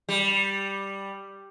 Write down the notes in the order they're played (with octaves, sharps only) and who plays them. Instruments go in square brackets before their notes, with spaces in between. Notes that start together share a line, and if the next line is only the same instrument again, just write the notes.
[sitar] G3